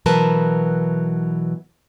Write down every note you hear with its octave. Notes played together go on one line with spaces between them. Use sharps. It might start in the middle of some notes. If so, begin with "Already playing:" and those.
B2 E3 F#3 A#4 B4 A5